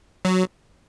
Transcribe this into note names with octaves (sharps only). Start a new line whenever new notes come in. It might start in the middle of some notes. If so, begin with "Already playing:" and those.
F#3